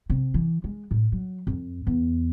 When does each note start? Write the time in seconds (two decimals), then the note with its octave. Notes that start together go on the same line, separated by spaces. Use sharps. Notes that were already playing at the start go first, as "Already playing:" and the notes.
0.10 C3
0.34 E3
0.64 G#3
0.91 A2
1.12 F#3
1.47 F2
1.87 E2